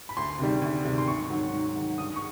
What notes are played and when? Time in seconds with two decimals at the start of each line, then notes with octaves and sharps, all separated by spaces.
0.09 B5
0.17 D2 C6
0.39 C3 D#3 G3
0.62 D2
0.85 C3 D#3 G3
0.98 C6
1.07 G#2 C#6
1.30 D#3 F#3
1.53 G#2
1.75 D#3 F#3
1.98 G2 D#6
2.16 C#6